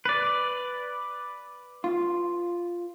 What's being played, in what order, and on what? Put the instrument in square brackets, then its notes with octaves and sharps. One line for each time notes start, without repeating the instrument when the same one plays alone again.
[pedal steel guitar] B4 D5
[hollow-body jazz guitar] F4